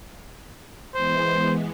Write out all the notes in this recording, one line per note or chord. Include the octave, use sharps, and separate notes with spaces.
E3 G#3 B3 C5